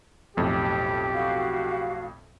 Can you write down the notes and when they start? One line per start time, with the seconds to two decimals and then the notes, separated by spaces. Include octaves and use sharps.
0.37 B1 F2 A2 G4
1.13 F#4 F5